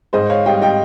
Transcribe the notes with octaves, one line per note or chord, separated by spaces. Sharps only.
G#2 C5 D#5
C#5 F5
G3 D#5 G5
D#5 G5